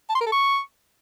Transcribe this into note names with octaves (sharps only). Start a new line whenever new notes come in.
A5
C6
A#4
A4
C#6